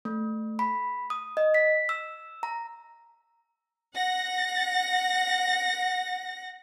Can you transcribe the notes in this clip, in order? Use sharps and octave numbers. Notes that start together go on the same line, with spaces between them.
A3
B5
D#6
D#5
B6
E6
A#5
F#5 A#6